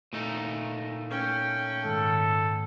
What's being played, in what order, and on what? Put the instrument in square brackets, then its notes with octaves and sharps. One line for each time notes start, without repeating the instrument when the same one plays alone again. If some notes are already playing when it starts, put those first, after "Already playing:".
[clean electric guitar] A#2 A3 D#4
[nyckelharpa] C#4 G5
[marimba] G#2 D#3 G#3 [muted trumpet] A4